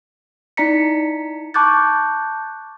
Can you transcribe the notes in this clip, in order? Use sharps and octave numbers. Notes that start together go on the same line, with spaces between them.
D#4 E4 D5 A#5 B6 C#7
A5 C#6 D6 F#6 G6 A6